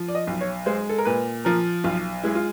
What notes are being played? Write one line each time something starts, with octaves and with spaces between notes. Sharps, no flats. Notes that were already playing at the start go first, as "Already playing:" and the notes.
Already playing: F3
D5
D#5
B1
C#5
G#3 C5
A4
A#4
A#2 B4
F3 A#4
B1 F4
G#3 E4
F4